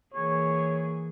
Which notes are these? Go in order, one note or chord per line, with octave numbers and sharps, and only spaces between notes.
E3 A#3 G#4 C#5